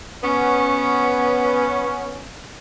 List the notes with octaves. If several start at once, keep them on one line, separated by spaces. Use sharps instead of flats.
B3 C#4